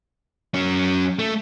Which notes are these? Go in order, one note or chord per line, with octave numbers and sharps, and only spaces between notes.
F#3 C#4
A3